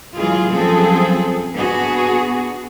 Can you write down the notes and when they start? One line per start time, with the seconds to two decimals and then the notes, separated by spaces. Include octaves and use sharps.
0.16 E3 F#3 G#3 F4 G#4
0.52 F#2 F3 G3 C4 G#4 A4
1.55 B3 D4 F#4 G#4